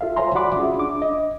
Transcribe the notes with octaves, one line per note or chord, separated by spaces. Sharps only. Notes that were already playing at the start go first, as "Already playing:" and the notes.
F4 A4 E5 F5
C5 C#5 E5 G#5 A#5 C6
F#4 D5 F#5 B5 C6 D6
C#4 F4 G#4 E5
D4 D6
D#5